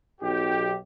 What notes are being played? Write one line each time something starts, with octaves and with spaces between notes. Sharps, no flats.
B1 G4